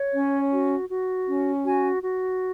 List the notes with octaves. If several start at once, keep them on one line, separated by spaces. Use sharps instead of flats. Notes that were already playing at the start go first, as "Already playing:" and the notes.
Already playing: C#5
C#4
F#4
F#4
C#4
F#4 G#5
F#4